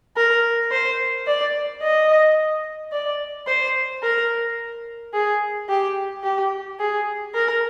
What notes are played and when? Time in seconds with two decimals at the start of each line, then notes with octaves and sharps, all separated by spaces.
0.17 A#4
0.71 C5
1.27 D5
1.82 D#5
2.92 D5
3.47 C5
4.03 A#4
5.13 G#4
5.69 G4
6.23 G4
6.79 G#4
7.34 A#4